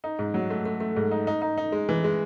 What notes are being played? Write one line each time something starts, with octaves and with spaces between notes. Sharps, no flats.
D#4
G#2
F#3
A3
A3
A3
G#2
D#4
D#4
D#4
D#4
G#3
E3
G#3